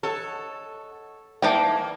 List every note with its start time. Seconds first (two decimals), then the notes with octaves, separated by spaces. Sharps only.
0.03 A4 C#5 D#5 F#5
1.42 E3 A#3 A4 D5 G5 A5 D#6